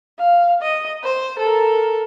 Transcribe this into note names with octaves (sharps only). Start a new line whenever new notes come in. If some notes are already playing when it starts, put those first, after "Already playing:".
F5
D#5
C5
A4 A#4